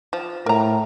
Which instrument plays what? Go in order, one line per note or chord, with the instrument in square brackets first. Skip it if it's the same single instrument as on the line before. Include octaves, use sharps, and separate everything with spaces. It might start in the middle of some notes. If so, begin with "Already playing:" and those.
[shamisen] F3
[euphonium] A2 [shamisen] A#4 A#5